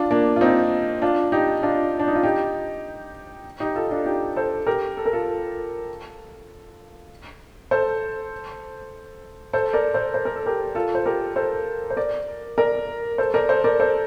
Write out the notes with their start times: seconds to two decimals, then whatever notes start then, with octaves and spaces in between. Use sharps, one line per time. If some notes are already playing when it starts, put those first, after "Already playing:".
Already playing: D4 F4
0.11 A#3 D4
0.36 F4
0.41 C4 D#4
1.02 D4 F4
1.32 D#4 G4
1.63 D4 F4
1.99 D4
2.08 D#4
2.15 F4
2.23 D#4 G4
3.60 D#4 G4
3.75 F4 A4
3.91 D4 F4
4.06 D#4 G4
4.36 A4 C5
4.67 G4 A#4
4.97 A4
5.06 A#4
5.13 F4 A4
7.71 A4 C5
9.53 A4 C5
9.73 A#4 D5
9.94 A4 C5
10.14 C5
10.25 A#4
10.36 A4
10.46 G4 A#4
10.75 F4 A4
10.95 C5
11.06 G4 A#4
11.36 A4 C5
11.90 C5
11.97 A#4 D5
12.58 A#4 D5
13.18 A4 C5
13.34 A#4 D5
13.49 A4 C5
13.64 A#4 D5
13.79 A4 C5